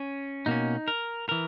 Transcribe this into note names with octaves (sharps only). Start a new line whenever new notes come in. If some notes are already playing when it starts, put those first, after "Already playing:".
Already playing: C#4
B2 A#3 C#4 D#4
A#4
E3 A#4